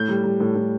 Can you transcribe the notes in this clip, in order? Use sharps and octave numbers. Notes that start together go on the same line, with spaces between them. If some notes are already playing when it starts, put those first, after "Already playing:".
Already playing: A2 G6
G3
G3
A2
A2